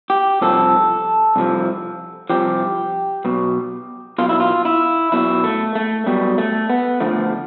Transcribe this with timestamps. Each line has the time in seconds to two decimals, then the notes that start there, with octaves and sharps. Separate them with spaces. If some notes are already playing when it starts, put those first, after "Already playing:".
0.10 G4
0.41 C2 C3 F3 A4
1.36 C2 C3 F3
2.30 C2 C3 F3 G4
3.25 B1 B2
4.18 B1 B2 F4
4.29 E4
4.40 F4
4.65 E4
5.12 B1 B2 E4
5.44 A3
5.75 A3
6.06 B1 B2 G3
6.38 A3
6.70 B3
7.00 D2 D3 F3 A3